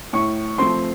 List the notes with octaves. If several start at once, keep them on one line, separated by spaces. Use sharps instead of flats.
A2 C#6
F3 A3 C4 C6